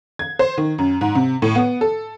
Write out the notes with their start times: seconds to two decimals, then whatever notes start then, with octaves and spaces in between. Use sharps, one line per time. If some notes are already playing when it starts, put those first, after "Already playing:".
0.19 G#6
0.39 C5
0.58 D#3
0.78 F#2
1.01 G#2
1.15 C3
1.42 A2
1.55 B3
1.81 A4